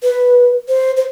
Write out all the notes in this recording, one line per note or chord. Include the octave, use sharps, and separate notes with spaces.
B4
C5
C5